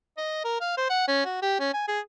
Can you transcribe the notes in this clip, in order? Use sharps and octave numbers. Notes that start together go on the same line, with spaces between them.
D#5
A#4
F5
C5
F#5
C#4
F#4
G4
C#4
G#5
G#4